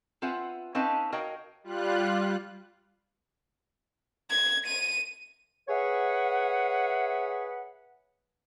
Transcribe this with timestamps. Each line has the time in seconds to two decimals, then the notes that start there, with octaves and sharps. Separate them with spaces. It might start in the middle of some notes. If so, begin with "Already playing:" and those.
0.22 C4 F4 B4 E5 F#5 G#5
0.75 C4 C#4 D#4 B4 F5 A5
1.12 F#4 A#4 C#5 D#5 F5 G5
1.64 G3 F4 F#6
4.30 G#6
4.67 D#7
5.68 G#4 B4 C#5 E5 F#5